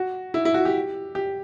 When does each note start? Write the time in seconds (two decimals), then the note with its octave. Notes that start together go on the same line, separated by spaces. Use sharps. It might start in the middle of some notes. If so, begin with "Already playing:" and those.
Already playing: F#4
0.34 E4
0.45 E4
0.54 F#4
0.65 G4
1.15 G4